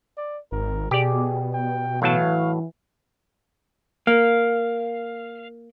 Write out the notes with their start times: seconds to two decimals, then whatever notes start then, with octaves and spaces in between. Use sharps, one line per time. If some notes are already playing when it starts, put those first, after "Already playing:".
0.17 D5
0.52 G#1 A#4
0.91 B2 G4 G#4 D5
1.53 G5
2.02 A2 E3 F#3 F5 A5
4.07 A#3 F5